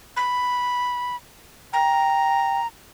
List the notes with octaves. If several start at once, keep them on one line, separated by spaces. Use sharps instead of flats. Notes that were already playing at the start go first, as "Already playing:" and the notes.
B5
G5 A#5